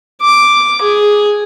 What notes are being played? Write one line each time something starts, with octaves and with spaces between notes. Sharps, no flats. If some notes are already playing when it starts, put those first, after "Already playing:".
D6
G#4